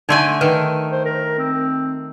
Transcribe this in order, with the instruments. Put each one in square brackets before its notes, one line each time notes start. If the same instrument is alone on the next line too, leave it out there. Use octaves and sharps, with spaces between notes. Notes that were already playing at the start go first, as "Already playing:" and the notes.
[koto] D3 A3 G#5 [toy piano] D#4 D5 C6
[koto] D#3 [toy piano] B4
[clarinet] C5
A#4
C4